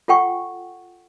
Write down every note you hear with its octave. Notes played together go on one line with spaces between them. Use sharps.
F4 A4 F#5 G5 C#6